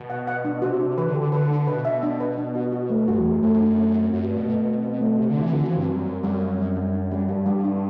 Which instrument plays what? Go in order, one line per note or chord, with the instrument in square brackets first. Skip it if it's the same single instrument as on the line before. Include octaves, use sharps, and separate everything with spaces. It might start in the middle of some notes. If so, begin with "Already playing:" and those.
Already playing: [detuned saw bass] B2
[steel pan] F#5
F#5
D4
[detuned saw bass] C3 [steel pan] F#4
[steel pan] D4
[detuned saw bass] E3 [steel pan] B4
[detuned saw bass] D3
[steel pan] G4
[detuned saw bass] D3
[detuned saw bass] D3 [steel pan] B4
[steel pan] D4
[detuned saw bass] B2 [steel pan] B4
[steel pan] E5
D4
B4
D4
F#4
F#4
A3
[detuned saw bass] G2 [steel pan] F#4
[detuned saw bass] E2
[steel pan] A3
[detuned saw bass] F#2
[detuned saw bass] F#2 [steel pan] A3
[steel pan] D4
A3
C4
[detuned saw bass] F#2 [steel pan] F#4
[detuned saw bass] G2
[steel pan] A3
[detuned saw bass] B2
[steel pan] A3
C4
C4
A3
[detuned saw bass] C3 [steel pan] F#4
[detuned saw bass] D3
[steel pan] C4
[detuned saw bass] E3
[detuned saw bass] D3 [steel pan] F#4
[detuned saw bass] E3
[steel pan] C4
[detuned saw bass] G2
[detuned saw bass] F#2 [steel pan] G3
[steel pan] C4
[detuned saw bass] F#2 [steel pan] G3
[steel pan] C4
G3
G3
D4
G3
[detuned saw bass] G2 [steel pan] G3
[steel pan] G3
D4